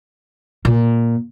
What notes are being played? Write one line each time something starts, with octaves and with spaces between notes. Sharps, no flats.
A#2